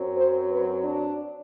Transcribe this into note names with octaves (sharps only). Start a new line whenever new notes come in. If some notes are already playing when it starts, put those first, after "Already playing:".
Already playing: F#2 F#3 C4
C5
B4
D4